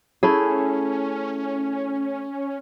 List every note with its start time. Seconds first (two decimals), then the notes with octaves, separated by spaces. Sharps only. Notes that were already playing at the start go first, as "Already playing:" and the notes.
0.23 A3 C#4 E4 G#4